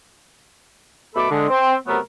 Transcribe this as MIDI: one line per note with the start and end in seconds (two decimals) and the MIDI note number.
1.16 1.30 47
1.16 1.30 57
1.16 1.30 69
1.16 1.30 83
1.16 1.30 86
1.31 1.46 50
1.31 1.46 56
1.49 1.75 60
1.88 1.99 48
1.88 1.99 54
1.88 1.99 57
1.88 1.99 59
1.88 1.99 70